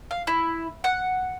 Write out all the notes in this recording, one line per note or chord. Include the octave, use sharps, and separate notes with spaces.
F5
E4
F#5